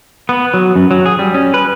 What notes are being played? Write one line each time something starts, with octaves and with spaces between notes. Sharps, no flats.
B3
F#3
F#2
F#3
G#4
G3
C#4
B4